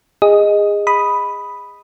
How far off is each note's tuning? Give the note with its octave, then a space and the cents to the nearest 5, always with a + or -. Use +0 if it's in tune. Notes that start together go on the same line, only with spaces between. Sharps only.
G#4 -25 D#5 +0
B5 +0 D#6 +0